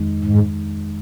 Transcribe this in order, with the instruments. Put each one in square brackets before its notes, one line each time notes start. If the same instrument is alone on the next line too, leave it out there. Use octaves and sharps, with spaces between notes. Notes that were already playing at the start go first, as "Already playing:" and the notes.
Already playing: [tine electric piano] F2 D#3 G#3 D#4
[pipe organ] G#2